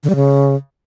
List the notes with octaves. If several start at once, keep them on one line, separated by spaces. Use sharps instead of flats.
D3
G3
C#3